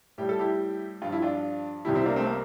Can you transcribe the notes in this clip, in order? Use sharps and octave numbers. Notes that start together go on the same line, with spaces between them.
A2 G3 G4
A4
E4 G4
G2 F3 F4
E4
D4 F4
C2 C3 G3 E4 G4
C4 E4
A#3 D4
A3 C4
A#3